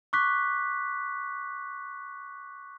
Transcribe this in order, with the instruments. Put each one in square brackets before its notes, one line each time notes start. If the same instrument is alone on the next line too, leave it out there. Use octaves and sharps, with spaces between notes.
[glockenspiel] C#6 D6 F#6 B6